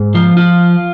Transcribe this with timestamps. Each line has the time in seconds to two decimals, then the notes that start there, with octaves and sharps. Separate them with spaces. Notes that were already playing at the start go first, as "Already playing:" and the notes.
Already playing: G#2
0.15 F3 F4
0.37 F4